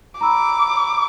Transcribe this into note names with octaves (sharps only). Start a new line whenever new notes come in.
A#5 B5 D6 E6